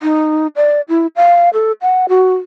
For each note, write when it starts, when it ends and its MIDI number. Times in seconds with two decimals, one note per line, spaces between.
0.03 0.47 63
0.56 0.81 74
0.89 1.07 64
1.16 1.49 77
1.53 1.72 69
1.82 2.06 78
2.09 2.34 66